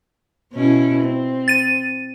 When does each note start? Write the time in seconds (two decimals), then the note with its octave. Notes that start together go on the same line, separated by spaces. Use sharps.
0.53 B2 C#4 E4
1.04 C4
1.48 A6 D#7